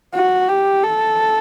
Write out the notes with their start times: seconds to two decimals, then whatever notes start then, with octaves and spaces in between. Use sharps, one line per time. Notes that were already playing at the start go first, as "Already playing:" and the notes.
0.14 F#4
0.48 G4
0.83 A4